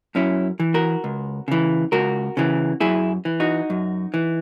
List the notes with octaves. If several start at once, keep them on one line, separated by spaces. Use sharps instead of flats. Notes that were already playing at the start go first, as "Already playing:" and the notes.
F#2 C#4 E4
E3
F#4 A#4
C#2
C#3 E3
C#2 F#4 A#4
C#3 E3
F#2 E4 G#4
E3
D#4 F#4
F#2
E3